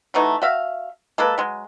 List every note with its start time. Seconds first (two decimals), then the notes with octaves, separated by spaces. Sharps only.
0.14 E3 F#3 A3 D#4
0.42 F#4 E5 F5
1.18 G#3 A#3 A4 B4
1.38 F#3 G#3